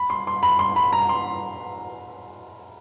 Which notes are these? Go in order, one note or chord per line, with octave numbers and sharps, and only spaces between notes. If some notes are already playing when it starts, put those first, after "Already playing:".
Already playing: B5
C6
C6
B5
C6
B5
A#5
C6